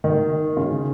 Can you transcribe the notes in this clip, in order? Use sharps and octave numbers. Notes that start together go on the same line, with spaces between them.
D#3
C#3